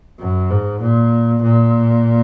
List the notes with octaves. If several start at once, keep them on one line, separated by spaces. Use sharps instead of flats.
F#2
G#2
A#2
A#2